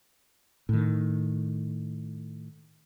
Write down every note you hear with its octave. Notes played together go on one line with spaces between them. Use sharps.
A2 D#3